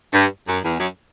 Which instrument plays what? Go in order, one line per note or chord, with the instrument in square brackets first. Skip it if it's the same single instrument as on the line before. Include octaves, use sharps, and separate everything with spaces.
[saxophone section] G2
F#2
E2
F#2